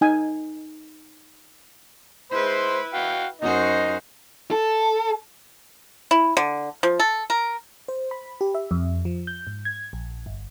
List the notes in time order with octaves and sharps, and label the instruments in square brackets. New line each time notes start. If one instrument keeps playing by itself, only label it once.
[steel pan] D#4 G#5
[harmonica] G#3 C5 C6 [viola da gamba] E4 B4
[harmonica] F#4 F5 G5
[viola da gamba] F#2 F#4 C5 [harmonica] D#4 D#5
[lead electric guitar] A4
[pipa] E4
D3
F3
A4
A#4
[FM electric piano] C5
B5
G4
E5
F2
F3
G6
G#2
G#6
A#1
G1